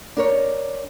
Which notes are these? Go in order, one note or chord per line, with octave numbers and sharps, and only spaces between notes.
D4 A#4 C#5